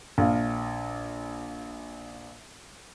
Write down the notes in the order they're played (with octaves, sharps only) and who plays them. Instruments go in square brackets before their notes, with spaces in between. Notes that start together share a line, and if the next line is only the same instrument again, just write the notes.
[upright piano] A#1 F5